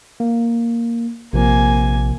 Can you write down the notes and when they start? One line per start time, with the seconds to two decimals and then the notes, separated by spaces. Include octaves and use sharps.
0.20 A#3
1.33 A#1 C3 F3 A#3 G#5